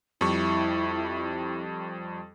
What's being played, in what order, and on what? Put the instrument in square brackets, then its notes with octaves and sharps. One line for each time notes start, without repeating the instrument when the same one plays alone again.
[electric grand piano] F2 G3 C#6 [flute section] E4